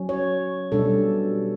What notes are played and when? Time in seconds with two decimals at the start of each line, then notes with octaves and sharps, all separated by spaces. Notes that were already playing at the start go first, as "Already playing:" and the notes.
Already playing: F#3 C#4
0.09 C#5
0.72 B2 G3 D4 A4